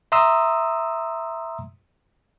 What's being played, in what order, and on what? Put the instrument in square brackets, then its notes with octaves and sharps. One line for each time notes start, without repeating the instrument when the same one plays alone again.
[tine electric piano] E5 A#5 C6 D#6 E6